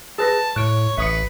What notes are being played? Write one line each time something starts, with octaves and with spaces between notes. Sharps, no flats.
G#4 B4 A5 A#6
A2 C#5 F#6 D7
A1 B4 E5 D#6 C#7